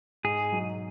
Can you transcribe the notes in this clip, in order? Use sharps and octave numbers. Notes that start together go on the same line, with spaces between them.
G#2 G#4
F#3 D#4